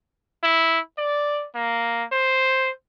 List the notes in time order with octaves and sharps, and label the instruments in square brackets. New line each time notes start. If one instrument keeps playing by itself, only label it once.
[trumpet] E4
D5
A#3
C5